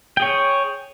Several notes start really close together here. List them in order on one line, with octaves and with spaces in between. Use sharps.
G5 G#4 C#5